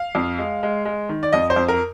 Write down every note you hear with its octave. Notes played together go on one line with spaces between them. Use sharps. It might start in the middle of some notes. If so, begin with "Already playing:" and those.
Already playing: F5
F2
G#3
G#3
G#3
D#3
D5
F2 D#5
C5
F2
A#4